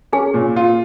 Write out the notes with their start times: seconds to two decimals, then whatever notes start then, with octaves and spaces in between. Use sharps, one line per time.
0.12 C#4 G#4 G#5
0.34 A#2
0.56 F4